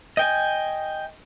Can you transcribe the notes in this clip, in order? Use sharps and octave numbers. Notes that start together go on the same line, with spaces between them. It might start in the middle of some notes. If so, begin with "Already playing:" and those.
D#5 G5 G#5